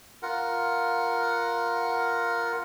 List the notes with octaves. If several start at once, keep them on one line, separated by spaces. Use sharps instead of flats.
F4 A#4 F#5